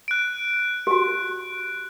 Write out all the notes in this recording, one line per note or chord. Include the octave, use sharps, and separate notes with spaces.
F#6 D7
F#4 G4